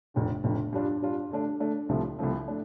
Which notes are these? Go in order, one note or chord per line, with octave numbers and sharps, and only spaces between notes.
F1 F2 D3
F1 F2 D3
G2 G3 D4 F4
G2 G3 D4 F4
D3 A3 D4
D3 A3 D4
C2 C3 F3 A3
C2 C3 F3 A3
A3 D4